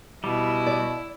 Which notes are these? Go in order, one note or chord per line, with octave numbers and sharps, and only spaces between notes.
B2 G3 E4
D5